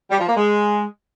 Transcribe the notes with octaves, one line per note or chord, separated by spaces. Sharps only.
G3
F3
A#3
G#3